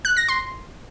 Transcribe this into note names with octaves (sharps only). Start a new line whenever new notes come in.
F#6
A#6
C6